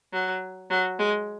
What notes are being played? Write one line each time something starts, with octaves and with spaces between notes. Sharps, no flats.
F#3
F#3
G#3